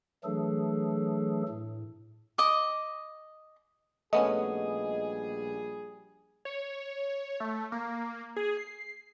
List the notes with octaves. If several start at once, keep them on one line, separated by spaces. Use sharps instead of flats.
E3 F#3 A3 D4 G#4 A4
A2
D#5 D6
A#1 G3 A3 B3 C#4 G#4 D#5
C#5
A3
A#3
G#4
C7